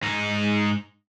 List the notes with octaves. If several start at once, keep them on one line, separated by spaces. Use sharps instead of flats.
G#2 D#4